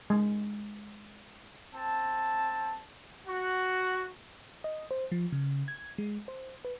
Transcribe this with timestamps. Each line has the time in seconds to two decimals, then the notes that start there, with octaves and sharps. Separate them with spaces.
0.10 G#3
1.74 C4 A5
3.27 F#4
4.64 D#5
4.91 C5
5.12 F3
5.32 C#3
5.68 G#6
5.98 G#3
6.28 C5
6.65 B4